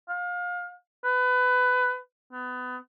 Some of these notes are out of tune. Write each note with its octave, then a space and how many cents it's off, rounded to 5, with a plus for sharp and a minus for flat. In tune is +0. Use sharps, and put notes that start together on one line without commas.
F5 +30
B4 +20
B3 +25